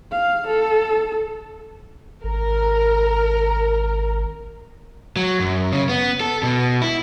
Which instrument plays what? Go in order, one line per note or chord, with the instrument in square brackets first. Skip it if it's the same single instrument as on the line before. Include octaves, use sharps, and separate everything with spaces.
[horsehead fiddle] F5
A4
[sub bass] G#1 [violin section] A#4
[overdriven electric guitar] F#3
F#2
C#3
B3
A4
B2
E4